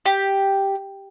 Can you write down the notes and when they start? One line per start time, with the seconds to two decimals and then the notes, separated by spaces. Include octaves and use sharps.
0.06 G4